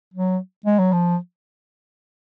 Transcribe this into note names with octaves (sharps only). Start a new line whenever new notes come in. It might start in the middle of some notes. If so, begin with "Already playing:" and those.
F#3
G#3
F#3
F3